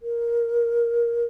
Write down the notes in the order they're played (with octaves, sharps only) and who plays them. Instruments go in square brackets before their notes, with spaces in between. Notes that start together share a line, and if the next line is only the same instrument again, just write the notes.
[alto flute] A#4